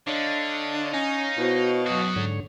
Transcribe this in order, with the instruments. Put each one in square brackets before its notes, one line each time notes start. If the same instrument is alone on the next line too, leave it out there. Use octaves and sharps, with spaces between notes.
[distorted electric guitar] D3 [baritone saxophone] D4 [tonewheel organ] C#5 D#5 F5
[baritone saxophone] C#4 [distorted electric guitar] D#4
[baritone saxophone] B2 [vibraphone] E4 F#4 C5
[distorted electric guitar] F#2 F#4 [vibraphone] F#3 D#6
[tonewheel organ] G#2 D3 C#5